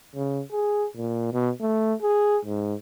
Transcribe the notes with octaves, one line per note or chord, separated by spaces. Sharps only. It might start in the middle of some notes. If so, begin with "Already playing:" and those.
C#3
G#4
A#2
B2
A3
G#4
G#2